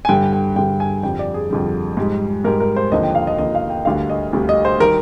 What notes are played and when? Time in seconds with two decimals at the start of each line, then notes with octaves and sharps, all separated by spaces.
0.05 G#5
0.09 G2 D3 G3 G5
0.33 G5
0.56 G2 D3 G3 G5
0.80 G#5
1.03 F2 D3 G3 G5
1.19 D5
1.34 G#4
1.50 F2 D3 G3
1.97 G#2 G3
2.44 G#2 G3 A#4
2.60 A#4
2.76 C5
2.92 D#2 D3 F3 D#5
3.03 G5
3.15 F5
3.27 D#5
3.38 D#2 D3 F3 D#5
3.55 F5
3.70 G5
3.85 D2 D3 G3 F5
4.09 D#5
4.33 D2 D3 G3
4.49 D#5
4.65 C5
4.80 D#3 G3 A#4